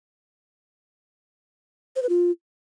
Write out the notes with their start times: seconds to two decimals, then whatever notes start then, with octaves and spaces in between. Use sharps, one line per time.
1.96 C5
2.03 B4
2.09 F4